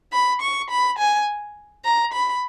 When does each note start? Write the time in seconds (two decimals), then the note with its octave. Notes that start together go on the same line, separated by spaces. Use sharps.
0.13 B5
0.41 C#6
0.70 B5
0.98 G#5
1.85 A#5
2.13 B5